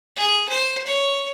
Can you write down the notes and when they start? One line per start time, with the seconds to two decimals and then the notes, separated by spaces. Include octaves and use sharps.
0.17 G#4
0.49 C5
0.87 C#5